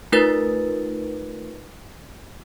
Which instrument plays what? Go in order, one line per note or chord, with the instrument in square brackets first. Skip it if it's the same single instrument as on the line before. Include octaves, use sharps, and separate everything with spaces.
[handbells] A3 D#4 F4 A#4 B4 A6